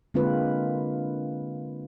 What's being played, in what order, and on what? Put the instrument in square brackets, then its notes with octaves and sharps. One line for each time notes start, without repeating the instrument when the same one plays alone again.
[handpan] D3 G#3 A#3 C4 F4 B4